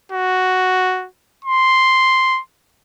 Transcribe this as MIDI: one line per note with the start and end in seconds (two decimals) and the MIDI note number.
0.12 1.07 66
1.45 2.40 84